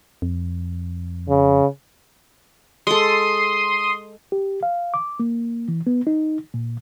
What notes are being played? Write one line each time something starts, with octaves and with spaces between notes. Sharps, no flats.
F2
C#3
G#3 A4 C6 D#6
G4
F5
D6
A#3
E3
B3
D#4
A#2